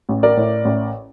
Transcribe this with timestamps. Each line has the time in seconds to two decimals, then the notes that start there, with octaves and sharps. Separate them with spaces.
0.09 A1
0.23 A#4 D5
0.37 A2
0.65 A1